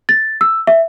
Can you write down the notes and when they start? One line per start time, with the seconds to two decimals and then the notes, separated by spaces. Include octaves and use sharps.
0.09 A6
0.41 E6
0.67 E5